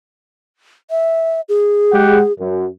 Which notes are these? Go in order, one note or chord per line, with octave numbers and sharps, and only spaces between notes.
E5
G#4
G#3 G4 F#5
F#2